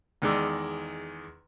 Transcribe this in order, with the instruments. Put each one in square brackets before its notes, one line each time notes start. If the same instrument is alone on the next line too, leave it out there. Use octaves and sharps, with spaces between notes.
[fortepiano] E2 D#3 G#3 D5 E6